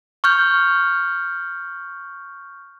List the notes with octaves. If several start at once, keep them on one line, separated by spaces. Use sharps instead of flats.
C#6 F6 G6